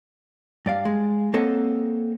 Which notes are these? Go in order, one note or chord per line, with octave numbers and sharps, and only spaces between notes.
G2 D5 F5
G#3
A#3 C4 A4 C#5 D#5 F#5